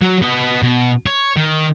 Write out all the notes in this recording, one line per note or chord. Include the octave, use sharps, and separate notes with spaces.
F#3
B3 D#5
B2
C#5
D#3